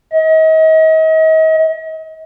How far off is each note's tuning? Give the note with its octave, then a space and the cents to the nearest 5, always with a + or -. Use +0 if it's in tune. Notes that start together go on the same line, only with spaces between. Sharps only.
D#5 +40